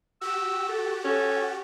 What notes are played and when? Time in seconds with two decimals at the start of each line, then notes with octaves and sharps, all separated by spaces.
0.21 F#4 G4 E6
0.69 A4
1.04 C#4 A4